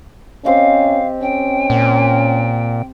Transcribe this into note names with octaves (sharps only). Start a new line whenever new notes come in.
C4 C#4 G4 D#5 F5
C#4 G5
A#2